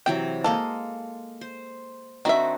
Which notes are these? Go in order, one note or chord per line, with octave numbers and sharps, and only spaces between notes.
C3 E3 F#3 G5
G#3 A#3 A4 D#5
C5
D#3 C4 D4 F#4 E5